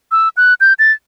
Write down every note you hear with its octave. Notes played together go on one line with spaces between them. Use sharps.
E6
F#6
G6
A6